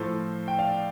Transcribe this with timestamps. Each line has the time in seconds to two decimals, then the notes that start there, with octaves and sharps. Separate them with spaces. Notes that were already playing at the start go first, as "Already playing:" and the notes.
Already playing: A2 F3 A4 C5
0.48 G5
0.58 D5 F5